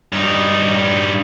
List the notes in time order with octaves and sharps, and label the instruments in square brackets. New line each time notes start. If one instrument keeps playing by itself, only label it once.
[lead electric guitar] G2 D#4